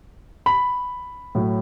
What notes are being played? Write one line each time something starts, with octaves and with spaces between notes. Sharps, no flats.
B5
A2 F#3